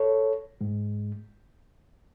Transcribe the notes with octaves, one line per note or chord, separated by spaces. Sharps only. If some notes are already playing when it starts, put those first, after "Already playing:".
Already playing: A4 C#5
G#2 G#3